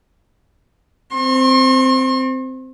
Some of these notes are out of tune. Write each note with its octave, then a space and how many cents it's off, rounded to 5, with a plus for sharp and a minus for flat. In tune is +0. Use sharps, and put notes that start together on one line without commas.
C4 -5 C6 +45